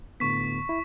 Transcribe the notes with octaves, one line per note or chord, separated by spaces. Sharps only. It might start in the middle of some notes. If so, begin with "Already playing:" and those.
A2 D3 B3 C#6 B6
E4